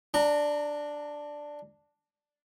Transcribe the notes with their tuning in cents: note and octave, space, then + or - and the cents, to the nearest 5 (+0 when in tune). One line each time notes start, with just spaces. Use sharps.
D4 +0 A#5 -30